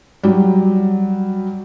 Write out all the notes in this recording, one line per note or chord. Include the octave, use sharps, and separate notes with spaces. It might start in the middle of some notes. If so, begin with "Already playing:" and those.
F#3 G3